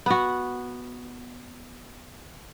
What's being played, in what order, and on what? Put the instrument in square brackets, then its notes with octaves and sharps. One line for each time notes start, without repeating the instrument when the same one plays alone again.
[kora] B3 F#4